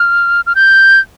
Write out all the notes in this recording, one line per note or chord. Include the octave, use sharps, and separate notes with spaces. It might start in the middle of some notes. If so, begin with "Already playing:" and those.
Already playing: F6
F6
G6